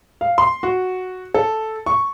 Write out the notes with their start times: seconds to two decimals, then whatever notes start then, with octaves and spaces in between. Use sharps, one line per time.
0.21 F5
0.38 C6
0.63 F#4
1.34 A4
1.86 C#6